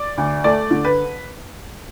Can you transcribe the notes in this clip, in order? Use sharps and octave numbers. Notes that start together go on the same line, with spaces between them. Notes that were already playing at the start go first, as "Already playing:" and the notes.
Already playing: D5
D2
A3 D5
D3
B4